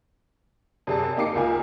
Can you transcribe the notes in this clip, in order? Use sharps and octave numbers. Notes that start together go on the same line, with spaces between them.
F#2 C3 G#4 D5 A5
A#3 D#4 G4 D6 C7 C#7
C#2 F4 A#4 G#5